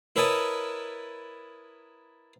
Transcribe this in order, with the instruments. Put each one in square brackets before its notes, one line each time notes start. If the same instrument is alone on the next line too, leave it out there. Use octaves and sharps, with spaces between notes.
[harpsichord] E4 A#4 B4 C#5 D#5 A5